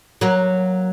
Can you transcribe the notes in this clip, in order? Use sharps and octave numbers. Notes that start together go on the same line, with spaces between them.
F#3 A#3